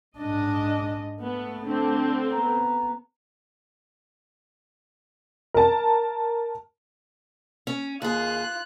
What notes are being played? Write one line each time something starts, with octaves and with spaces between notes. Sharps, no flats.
G#2 D4 D#5
A3 B3
D3 C4 D4
B3 A#5
A#4 A5
C#4
D#2 F4 G#4 F#6